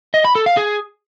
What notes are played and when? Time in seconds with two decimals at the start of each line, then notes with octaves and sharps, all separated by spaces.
0.14 D#5
0.25 B5
0.35 A4
0.46 F5
0.57 G#4